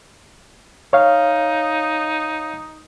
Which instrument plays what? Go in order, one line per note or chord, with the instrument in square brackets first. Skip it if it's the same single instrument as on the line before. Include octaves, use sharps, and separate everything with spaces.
[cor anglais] D#4 [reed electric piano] C#5 F5